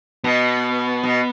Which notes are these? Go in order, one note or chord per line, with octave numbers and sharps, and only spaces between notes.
B2 B3
B2